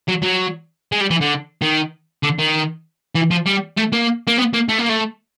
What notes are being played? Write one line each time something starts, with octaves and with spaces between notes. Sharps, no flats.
F#3
F#3
G#3
G3
E3
D3
D#3
D3
D#3
E3
F3
G3
A3
A#3
A#3
B3
A#3
A3
A#3
A3